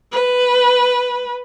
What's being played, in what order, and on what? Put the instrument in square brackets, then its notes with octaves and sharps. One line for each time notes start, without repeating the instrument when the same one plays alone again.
[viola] B4